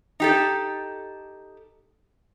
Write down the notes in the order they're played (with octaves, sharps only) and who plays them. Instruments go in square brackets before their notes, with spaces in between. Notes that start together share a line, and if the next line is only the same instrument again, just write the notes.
[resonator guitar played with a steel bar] D#4 G4 A4